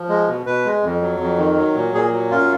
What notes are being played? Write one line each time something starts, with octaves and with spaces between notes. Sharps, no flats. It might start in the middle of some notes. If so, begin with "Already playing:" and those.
Already playing: F3
G#3
B2
B2 B4
G#3
F2
F#3
F2
D#3
F#3
A#2
A#2 G#4
F#3
F#2 F4